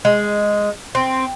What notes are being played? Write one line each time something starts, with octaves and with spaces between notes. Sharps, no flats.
G#3
C4